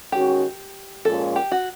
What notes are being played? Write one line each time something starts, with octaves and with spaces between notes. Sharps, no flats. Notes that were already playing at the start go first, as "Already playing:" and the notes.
D#3 G#3 C#4 F#4 G4
A#2 F3 G#3 C#4 F4 A4
G4
F#4